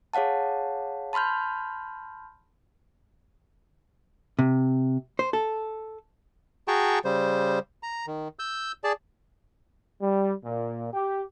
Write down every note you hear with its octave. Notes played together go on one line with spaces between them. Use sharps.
G#4 C#5 F5 F#5 A5
A5 B5 C6 F6 G6
C3
C5
A4
F#4 G#4 G5 A5 A#5 C#6
C#3 G3 C5
A#5
D#3
E6 G6
G#4 D5 A5
G3
A#2
G4